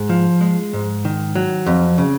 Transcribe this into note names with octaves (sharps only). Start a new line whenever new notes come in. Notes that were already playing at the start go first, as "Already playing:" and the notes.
Already playing: G#2
F3
G#3
G#2
D#3
F#3
F2
C#3